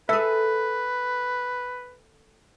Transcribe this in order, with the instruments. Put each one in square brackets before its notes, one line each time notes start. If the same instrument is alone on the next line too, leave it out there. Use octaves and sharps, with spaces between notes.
[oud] G#4 A4 [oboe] B4 [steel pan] E5